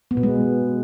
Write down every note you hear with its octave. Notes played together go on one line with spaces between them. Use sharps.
B3
B2
G#3